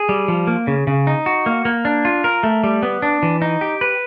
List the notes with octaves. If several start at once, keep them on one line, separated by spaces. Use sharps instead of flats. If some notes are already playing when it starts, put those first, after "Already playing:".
Already playing: G#4
G3
F3
A#3
C#3
C#3
D#4
F#4
A#3
A#3
D4
F4
A#4
A3
G3
B3
D4
E3
D#4
G4
B4